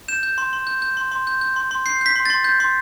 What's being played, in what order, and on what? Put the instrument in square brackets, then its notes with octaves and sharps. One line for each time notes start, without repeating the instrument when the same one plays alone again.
[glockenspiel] G6 E7
G6
C6
C6
G6
G6
C6
C6
G6
G6
C6
C6
G6 C7
G6 B6
C6
A6
C6
G6
C6